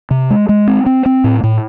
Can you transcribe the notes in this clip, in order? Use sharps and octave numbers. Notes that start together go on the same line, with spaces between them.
C3
G#3
G#3
C4
C4
C4
A2
A2